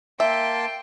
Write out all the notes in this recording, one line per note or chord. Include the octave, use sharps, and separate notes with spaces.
A#3 E5 G5 A5 C6